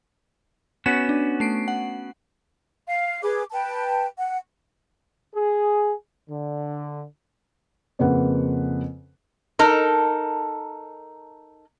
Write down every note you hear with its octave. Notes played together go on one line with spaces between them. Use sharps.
B3 C#4 F#4 B6 E7
D4
A3 C7 D7
F#5
F5
G#4 B4 D6
B4 G5 A5
F#5
G#4
D3
F2 C#3 A#3 B4 F#5
D#4 A4 A#4